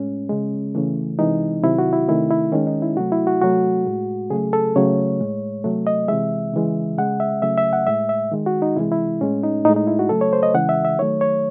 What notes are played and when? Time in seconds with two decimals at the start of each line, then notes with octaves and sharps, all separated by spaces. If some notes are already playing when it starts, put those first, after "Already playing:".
Already playing: A2 G#3 C#4
0.29 C#3 G#3
0.75 C#3 E3 A3
1.19 C3 E3 G#3 D#4
1.63 C3 D#3 F#3 E4
1.78 F#4
1.93 E4
2.08 C3 D#3 A3 E4
2.31 E4
2.52 D#3 G#3 C#4
2.67 D#4
2.82 E4
2.97 C3 F#3 A3 F#4
3.12 E4
3.27 F#4
3.41 C3 F#3 A3 F#4
3.86 A2 G#3
4.30 C#3 F#3 A3 G#4
4.53 A4
4.76 C#3 F#3 A3 C#5
5.21 A2 G#3
5.64 C3 F#3 A3
5.87 D#5
6.08 C3 E3 G#3 E5
6.54 C#3 E3 G#3
6.98 C#3 G#3 F#5
7.20 E5
7.42 C#3 F#3 A3 E5
7.58 E5
7.73 F#5
7.87 A2 G#3 E5
8.09 E5
8.32 D#3 G#3
8.46 F#4
8.62 D#4
8.76 C3 E3 G#3 E4
8.92 E4
9.21 A2 G#3 C#4
9.43 D#4
9.65 A2 G#3 D#4
9.76 D#4
9.87 E4
9.99 F#4
10.09 C#3 F#3 A3 A4
10.21 C#5
10.33 C5
10.43 D#5
10.54 C#3 E3 G#3 F#5
10.69 E5
10.85 E5
10.99 D#3 F#3 A3 C#5
11.21 C#5